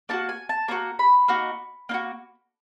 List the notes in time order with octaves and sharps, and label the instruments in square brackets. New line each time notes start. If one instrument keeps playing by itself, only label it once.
[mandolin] A#3 D#4 F#4 A5
G#5
A5
A#3 D#4 F#4 A#5
B5
A#3 D#4 F#4
A#3 D#4
F#4